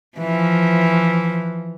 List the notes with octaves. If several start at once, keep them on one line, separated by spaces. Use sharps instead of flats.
E3 F3